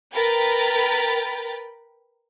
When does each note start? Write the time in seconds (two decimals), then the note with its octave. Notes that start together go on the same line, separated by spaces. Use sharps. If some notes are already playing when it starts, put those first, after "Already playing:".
0.15 A#4 B4 G5 B5 A6